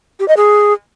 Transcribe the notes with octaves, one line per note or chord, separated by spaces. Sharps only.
G4
D#5
G#4